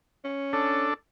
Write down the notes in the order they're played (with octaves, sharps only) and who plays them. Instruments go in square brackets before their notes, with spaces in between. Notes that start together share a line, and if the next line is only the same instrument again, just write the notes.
[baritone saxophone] C#4
[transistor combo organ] D4 A4